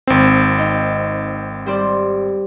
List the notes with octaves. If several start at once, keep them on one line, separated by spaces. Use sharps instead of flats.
G#1 C4
D#4
G3 C5 D5